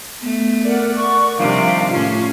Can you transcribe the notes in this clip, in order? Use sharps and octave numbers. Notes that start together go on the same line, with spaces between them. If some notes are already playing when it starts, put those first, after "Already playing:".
A3 B3
A#4 D5 F#5
A#4 C#6
C3 D#3 F3 G3 D4 F5
A2 C#4 F4 C#6 C7